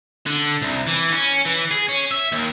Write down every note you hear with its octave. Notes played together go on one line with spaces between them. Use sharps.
D3
C2
E3
C#4
E3
G#4
C#4
E5
D#2